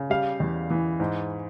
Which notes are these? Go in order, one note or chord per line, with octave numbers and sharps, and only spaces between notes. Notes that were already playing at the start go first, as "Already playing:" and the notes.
Already playing: C#3
G3 F5
E2
E3
G#2